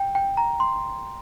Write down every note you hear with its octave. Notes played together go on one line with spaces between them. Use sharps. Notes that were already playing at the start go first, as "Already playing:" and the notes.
Already playing: G5
G5
A#5
C6